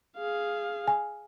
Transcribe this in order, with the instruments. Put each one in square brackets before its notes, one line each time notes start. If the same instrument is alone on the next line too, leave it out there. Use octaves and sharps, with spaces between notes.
[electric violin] G#4 F5
[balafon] G#5